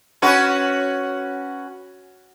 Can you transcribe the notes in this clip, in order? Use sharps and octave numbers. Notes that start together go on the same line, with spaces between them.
C#4 F#4 B4